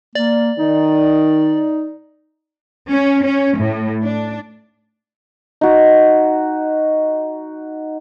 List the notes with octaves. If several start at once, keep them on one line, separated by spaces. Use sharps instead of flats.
A#3 D5
D#3 D#4
C#4
C#4
A2
D4
D#4 F#4